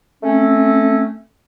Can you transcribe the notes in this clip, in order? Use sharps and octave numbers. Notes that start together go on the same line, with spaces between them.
A3 C4 C#4